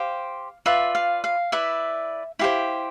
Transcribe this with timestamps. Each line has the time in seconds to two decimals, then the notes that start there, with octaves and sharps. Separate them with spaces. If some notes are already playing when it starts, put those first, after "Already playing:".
Already playing: G4 C5 F5
0.66 F4 B4 D5 E5
0.95 F5
1.24 F5
1.52 E4 B4 D5 E5
2.39 E4 G4 C5 F5